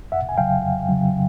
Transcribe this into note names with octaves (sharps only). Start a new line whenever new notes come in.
F2 E5 F#5
G#5
C#3 F#3 F5 G5
F2
C#3 F#3